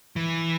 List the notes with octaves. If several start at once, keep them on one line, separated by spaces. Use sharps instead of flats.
E3